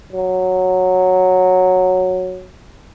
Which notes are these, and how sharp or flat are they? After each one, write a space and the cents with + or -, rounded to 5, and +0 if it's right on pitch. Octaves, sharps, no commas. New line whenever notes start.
F#3 -5